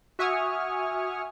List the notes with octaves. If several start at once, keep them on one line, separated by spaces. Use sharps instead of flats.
F#4 E5 G#5 C#6 D#6 F6